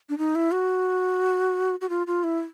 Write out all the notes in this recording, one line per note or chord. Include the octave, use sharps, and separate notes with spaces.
D4
D#4
E4
F#4
F#4
F4
F4
E4